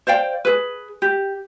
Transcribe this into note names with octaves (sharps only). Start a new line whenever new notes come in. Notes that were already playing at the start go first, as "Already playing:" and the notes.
C5 D5 F5 G5
G#4 B4
G4